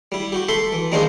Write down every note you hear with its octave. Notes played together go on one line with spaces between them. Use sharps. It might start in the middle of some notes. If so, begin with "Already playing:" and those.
G3 E4
F#4 G4
A4 E5 B5 C6
E3
D#3 G3 G#3 A#3 D4 C5